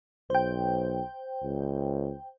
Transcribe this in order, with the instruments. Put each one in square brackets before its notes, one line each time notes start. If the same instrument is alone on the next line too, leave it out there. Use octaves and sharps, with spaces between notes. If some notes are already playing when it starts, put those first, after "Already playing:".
[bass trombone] B1 [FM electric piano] C5 G5
[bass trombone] C#2